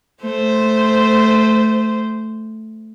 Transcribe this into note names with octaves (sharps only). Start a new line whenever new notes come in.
A3 C5